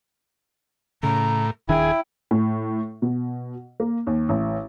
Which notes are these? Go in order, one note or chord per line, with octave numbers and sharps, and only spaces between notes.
A2 C#3 A#5
D#1 D#3 D4 E4 G#4 G5
A2
B2
A#3
D#2
A1